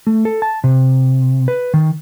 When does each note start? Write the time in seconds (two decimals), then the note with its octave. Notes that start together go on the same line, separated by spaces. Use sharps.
0.07 A3
0.25 A4
0.42 A5
0.64 C3
1.48 B4
1.74 D#3